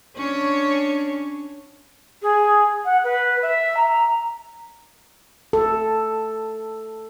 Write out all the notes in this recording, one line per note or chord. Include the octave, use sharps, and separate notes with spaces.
C#4 D4 C#5
G#4
F#5
B4
E5
A#5
A4